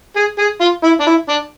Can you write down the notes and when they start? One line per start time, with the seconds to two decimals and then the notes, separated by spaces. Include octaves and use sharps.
0.16 G#4
0.38 G#4
0.60 F4
0.84 E4
1.00 D4
1.07 E4
1.29 D4